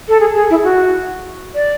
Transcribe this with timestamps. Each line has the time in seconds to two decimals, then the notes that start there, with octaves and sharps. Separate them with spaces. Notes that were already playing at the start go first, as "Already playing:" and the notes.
0.09 A4
0.20 G#4
0.35 G#4
0.50 E4
0.64 F#4
1.55 D5